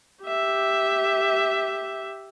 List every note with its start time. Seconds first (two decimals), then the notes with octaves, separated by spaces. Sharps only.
0.24 G4 E5